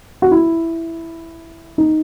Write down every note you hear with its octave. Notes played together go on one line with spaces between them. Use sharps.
F#4
E4
D#4